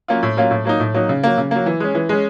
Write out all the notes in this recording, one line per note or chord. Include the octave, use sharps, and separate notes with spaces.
F#3 A#3 C#4 F4
A2
F#3 A#3 C#4 F4
A2
F#3 A#3 D#4
A2
F#3 A#3 D#4
C#3
F#3 A#3
C#3
F#3 A#3
E3
G#3 C#4
E3
G#3 C#4